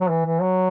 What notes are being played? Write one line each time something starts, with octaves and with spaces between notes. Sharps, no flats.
F#3
E3
E3
F#3